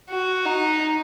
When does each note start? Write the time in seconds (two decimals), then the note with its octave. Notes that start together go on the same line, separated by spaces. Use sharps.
0.10 F#4
0.45 D#4